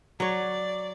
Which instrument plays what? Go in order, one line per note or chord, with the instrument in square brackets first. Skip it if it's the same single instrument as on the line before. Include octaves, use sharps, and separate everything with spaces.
[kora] F#3 C#5 [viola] D5